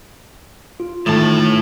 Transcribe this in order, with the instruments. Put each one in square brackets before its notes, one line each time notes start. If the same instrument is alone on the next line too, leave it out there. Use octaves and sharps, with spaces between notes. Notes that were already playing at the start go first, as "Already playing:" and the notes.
[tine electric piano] F4
[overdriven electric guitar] A2 A5 [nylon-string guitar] D#3 E3 A3